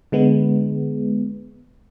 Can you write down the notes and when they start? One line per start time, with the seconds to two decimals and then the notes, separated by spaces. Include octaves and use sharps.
0.12 D3 G#3 B3